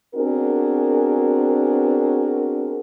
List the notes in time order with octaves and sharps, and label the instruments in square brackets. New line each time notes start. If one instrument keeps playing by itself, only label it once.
[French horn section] B3 C4 D4 F#4 G#4 A#4